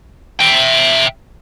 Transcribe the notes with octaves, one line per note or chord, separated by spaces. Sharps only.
E5 G5